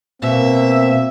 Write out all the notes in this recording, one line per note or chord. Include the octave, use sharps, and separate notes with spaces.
B2 A#3 C4 E5